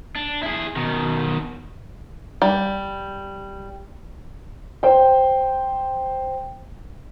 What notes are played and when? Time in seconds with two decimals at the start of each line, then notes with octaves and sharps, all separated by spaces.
0.15 D4
0.42 E4 G#4
0.76 B2 D#3
2.42 G3
4.83 C5 G5